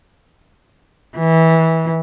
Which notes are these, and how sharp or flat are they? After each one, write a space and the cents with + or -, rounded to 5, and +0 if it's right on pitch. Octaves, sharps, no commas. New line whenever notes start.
E3 -20